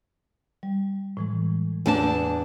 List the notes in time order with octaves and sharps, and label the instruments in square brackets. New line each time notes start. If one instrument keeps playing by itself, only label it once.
[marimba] G3
A2 E3 G#3
[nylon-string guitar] E2 D4 A5